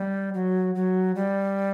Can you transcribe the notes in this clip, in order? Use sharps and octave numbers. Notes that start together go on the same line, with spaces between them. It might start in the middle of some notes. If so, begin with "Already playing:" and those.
Already playing: G3
F#3
F#3
G3